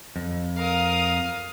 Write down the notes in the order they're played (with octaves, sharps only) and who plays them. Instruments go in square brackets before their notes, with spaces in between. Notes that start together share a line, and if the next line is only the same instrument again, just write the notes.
[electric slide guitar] F2
[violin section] A#4 F5 D#6